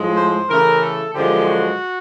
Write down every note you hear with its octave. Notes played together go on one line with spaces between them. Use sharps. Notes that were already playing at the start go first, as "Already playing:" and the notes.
Already playing: A2 F3 G#3
C5
C#3 E3 A3 A#4
A4
F#2 D3 F3 G#3 G4
F#4